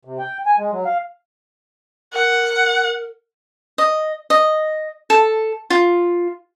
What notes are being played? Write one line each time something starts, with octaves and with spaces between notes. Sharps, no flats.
C3
G5
G#5
G#3
F#3
F5
A#4 F#5
D#5
D#5
A4
F4